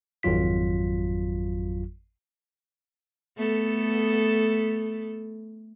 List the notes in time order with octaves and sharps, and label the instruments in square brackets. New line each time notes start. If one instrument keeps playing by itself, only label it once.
[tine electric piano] G#1 F2 F#3 F4 B6
[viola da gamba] A3 B3 A4